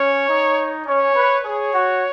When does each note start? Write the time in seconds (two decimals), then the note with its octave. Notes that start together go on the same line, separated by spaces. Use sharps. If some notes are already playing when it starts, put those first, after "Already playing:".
Already playing: C#4 C#5
0.29 D#4
0.86 C#4 C#5
1.15 B4
1.44 G#4 C#5
1.73 F#4